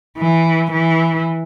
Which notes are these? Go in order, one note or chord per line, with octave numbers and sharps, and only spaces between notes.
E3
E3